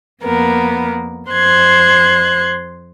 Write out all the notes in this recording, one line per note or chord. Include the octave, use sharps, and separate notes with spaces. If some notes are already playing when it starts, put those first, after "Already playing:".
F2 A#3 B3 A#4
F2 C5 C6 F#6 G#6